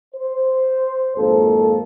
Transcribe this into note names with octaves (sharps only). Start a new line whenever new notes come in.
C5
G#1 F2 A#3 A4 C5